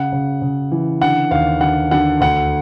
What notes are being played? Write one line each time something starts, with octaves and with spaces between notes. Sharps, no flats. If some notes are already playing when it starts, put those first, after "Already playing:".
Already playing: C#3 F#5
C#3
C#3
E3
D3 F#5
D#2 F5
D3 F#5
D3 F#5
D2 F#5